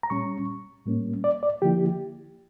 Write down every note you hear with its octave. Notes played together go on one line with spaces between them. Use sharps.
A#5
A#2 G3 C#4 C#6
A2 G3 A#3 C#4
D5
D5
D3 F3 A#3 E4 G4